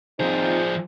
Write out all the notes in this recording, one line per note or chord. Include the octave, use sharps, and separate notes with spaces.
F3 C4 D#4 F4 G#4 C5